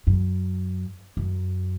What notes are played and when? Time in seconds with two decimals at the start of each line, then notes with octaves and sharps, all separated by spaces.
0.07 F#2
1.17 F#2